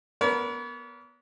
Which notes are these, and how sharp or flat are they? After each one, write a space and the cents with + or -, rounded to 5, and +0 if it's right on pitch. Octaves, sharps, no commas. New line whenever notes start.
B3 -15 A#4 +0 C#5 +45